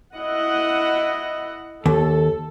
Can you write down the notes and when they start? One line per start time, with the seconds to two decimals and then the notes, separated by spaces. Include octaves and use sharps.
0.16 E4 D#5 F#5
1.86 D#2 A4